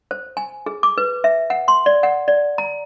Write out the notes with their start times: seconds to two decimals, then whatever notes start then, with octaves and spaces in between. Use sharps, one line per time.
0.11 C5
0.37 G#5
0.66 G#4
0.83 D6
0.98 B4
1.24 E5
1.50 F#5
1.68 C6
1.86 D5
2.03 F#5
2.28 D5
2.58 A#5